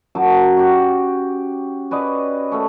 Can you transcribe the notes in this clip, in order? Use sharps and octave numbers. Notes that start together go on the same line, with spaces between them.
F#2 F#3 A5
C#4 F#4 G4
C#4 B4 D5 D#5
A3 C#4